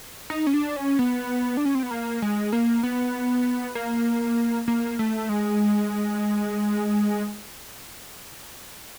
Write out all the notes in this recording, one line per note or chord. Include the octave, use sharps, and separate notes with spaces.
D#4
C#4
D4
C#4
B3
D4
C#4
C4
B3
A#3
G#3
A#3
B3
A#3
A#3
A3
G#3